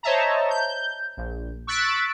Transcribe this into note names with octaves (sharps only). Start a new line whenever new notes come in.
C5 C#5 D#5 E5 A5 A#5
G6
A#1
C#6 E6 F#6 A6 B6 D7